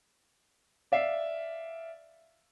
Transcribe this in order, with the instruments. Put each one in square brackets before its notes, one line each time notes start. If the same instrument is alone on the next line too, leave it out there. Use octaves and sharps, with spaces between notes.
[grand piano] D5 E5 F5 C7